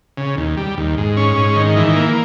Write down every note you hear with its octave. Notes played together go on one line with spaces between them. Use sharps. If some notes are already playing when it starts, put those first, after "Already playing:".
C#3
D#2
G3
D#2
G#2
C#4
G#2
D#3
E3
A#3